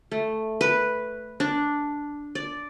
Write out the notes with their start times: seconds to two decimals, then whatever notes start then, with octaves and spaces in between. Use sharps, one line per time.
0.12 A3
0.61 B4
1.40 D4
2.35 D5